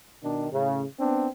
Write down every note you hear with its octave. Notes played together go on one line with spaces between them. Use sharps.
B2 D#3 D4
A2 C#3
B3 C4 D4